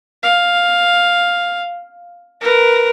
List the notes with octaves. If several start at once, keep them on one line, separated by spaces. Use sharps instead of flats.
F5
A#4 B4